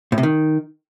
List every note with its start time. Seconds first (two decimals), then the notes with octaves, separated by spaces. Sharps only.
0.12 A2
0.18 C3
0.23 D#3